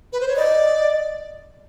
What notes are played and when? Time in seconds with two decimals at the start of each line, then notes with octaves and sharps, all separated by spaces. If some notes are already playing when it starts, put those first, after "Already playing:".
0.13 B4
0.21 C5
0.28 C#5
0.36 D5 D#5